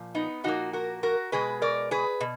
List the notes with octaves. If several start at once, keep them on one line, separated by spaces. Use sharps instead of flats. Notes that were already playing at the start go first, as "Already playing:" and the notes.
Already playing: A#2 F3
B3 D#4
A#2 F3 A#3 D#4 F#4
F#4 A#4
F#4 A#4
B2 G#3 G#4 B4
A#4 D5
G#4 B4
B2